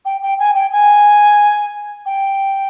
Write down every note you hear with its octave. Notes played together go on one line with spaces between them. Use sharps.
G5
G5
G#5
G5
G#5
G5